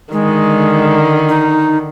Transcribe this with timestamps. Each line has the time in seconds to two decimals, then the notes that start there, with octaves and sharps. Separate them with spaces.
0.12 D3 D#3 G#3
1.29 D#4